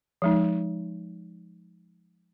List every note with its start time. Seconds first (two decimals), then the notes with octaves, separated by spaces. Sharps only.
0.22 F3 G#3 D#4